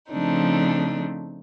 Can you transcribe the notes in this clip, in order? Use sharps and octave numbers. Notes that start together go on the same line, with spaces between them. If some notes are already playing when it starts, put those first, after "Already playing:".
C#3 F3 A3 C4 D4 D#4